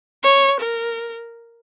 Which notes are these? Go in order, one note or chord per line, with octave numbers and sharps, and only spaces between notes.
C#5
A#4